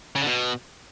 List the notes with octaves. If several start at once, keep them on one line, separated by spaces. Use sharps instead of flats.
C#3
D3
B2